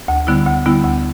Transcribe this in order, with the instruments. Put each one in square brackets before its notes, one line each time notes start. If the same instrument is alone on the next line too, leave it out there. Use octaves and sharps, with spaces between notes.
[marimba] D2
D3 G3 B3 E4
D2
D3 G3 B3 E4
D2